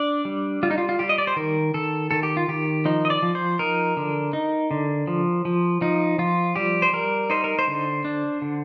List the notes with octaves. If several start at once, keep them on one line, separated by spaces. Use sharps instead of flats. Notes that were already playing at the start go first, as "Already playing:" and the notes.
Already playing: D4 D5
G3
G3 F4
D#4
F4
F4
G3 G4
D#5
D5
C5
D#3 A#4
D#3 A4
D#3 A4
G4
F4
D#3 G4
F3 D#4
D#5
D5
F3
C5
D#4 A#4
D3
D#4
D3
F3
F3
F3 D#4
F3 F4
G3 G4
C5
G3 A#4
D#4 C5
A#4
C5
D3
D4
D3